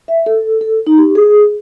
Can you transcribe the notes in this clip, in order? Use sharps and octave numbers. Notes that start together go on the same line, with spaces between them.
E5
A4
A4
D#4
G4
G#4